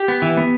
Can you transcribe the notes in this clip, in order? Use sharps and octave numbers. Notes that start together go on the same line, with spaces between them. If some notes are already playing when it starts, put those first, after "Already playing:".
Already playing: G4
B3
E3
B3